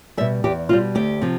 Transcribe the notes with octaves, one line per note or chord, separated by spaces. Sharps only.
B2 G3 E5
E2 G4
B2 G3 F4
D2 G4
C3 F3